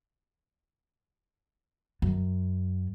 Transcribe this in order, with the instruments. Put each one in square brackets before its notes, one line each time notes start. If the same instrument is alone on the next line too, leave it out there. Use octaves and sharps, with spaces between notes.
[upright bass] F#2